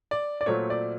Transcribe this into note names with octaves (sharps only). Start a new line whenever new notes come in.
D5
D5
A#2 F#3 A3 C4 C#5
D5